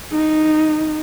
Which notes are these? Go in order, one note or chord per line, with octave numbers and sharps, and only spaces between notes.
D#4